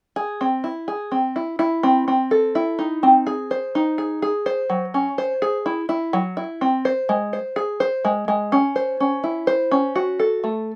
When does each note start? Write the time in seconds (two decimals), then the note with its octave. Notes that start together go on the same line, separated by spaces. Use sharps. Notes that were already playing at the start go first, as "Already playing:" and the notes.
0.16 G#4
0.41 C4
0.64 E4
0.88 G#4
1.12 C4
1.36 E4
1.59 E4
1.83 C4
2.08 C4
2.31 A4
2.55 E4
2.79 D#4
3.03 C4
3.27 G#4
3.51 C5
3.75 D#4
3.98 G#4
4.22 G#4
4.46 C5
4.70 F#3
4.94 C#4
5.18 C5
5.42 G#4
5.66 E4
5.89 E4
6.13 F#3
6.37 E4
6.61 C4
6.85 C5
7.09 G#3
7.33 C5
7.56 G#4
7.80 C5
8.05 G#3
8.28 G#3
8.52 C#4
8.76 C5
9.00 C#4
9.24 E4
9.47 C5
9.71 C#4
9.96 F#4
10.20 A4
10.44 A3